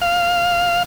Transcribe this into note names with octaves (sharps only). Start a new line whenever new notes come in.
F5